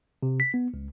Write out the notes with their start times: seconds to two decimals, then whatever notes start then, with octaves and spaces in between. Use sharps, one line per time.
0.23 C3
0.40 B6
0.54 B3
0.74 C#2